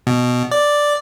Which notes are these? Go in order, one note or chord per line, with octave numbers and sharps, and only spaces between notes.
B2
D5